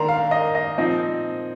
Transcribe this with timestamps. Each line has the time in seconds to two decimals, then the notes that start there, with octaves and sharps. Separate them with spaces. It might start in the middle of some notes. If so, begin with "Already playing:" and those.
Already playing: D#3 A#3 D4 A#5 C6
0.08 F5
0.31 D#5
0.55 D#5
0.78 A#2 F3 C4 D#4 D#5